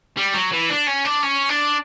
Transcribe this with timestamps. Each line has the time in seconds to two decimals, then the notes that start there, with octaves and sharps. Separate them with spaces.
0.17 G3
0.34 F#3
0.52 E3
0.69 D4
0.87 C#4
1.05 D4
1.23 C#4
1.49 D4